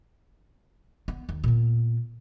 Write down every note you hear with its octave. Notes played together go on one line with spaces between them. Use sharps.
B3
D#2
A#2 B3